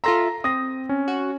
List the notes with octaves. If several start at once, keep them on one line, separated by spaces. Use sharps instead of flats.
F4 A4 E5 A#5 C6 A#6
C4 D#6 A#6
C#4
F#4